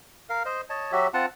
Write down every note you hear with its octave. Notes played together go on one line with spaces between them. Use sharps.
A#4 F5
C5 D#5
C#5 D#5 A5
F#3 F#4 G4 E5
C4 F4 F#5 A5